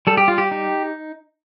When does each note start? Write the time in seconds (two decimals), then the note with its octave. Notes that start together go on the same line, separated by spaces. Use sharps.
0.07 G3 A4
0.17 G4
0.28 F4
0.38 G4
0.51 D#4